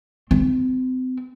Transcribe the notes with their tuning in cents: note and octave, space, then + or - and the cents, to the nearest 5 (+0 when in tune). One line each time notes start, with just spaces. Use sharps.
C4 -35